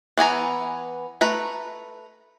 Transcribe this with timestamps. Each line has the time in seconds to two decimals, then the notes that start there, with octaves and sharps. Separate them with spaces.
0.18 E3 B3 G#5 A#5
1.21 A3 B4 A#5